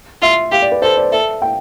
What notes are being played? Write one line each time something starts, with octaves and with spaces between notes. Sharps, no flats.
F4 E5
G4 F5
D5
B4
A4 C5
D5
A4 E5
G5